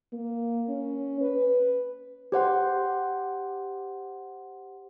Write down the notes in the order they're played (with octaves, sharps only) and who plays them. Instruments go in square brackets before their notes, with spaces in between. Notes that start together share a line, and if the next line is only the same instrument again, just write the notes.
[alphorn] A#3
C#4
B4
[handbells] G4 C5 F#5 C6